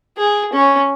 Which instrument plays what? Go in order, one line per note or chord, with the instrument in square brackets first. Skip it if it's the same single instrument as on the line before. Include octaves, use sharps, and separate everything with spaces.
[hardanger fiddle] G#4
C#4